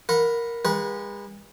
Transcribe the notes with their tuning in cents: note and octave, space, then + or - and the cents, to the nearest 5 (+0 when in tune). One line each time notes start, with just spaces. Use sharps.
A#4 +0 F#5 -25 B5 +0
G#3 -40 B4 -40 F#5 +0